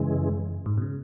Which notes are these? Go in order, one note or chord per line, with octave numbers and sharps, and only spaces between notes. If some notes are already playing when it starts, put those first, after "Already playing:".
Already playing: F#2 C#3 E3 G#3
G#2
B2
C#3